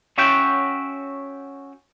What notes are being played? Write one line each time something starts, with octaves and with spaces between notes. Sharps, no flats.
C#4 F#4 C#5 E5 F#5 G5